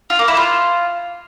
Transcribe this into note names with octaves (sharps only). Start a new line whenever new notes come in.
F4
A#3
E4
F4